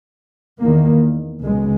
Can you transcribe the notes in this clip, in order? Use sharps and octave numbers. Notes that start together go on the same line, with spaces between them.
E2 D#3 A#3
C#2 B2 G#3